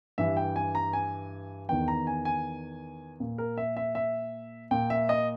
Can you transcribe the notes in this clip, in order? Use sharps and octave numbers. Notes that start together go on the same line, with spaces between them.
G2 E3 E5
G5
G#5
A#5
G#5
E2 D#3 G5
A#5
G#5
G#5
A#2
A#4
E5
E5
E5
A#2 G5
E5
D#5